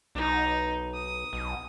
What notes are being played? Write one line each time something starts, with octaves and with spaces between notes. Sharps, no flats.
B1 D#4
D#6
B1